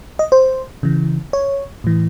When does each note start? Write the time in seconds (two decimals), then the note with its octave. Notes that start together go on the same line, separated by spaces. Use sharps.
0.19 D#5
0.32 C5
0.83 C#3 E3
1.33 C#5
1.84 A2 E3